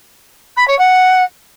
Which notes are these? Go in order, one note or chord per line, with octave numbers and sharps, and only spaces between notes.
B5
C#5
F#5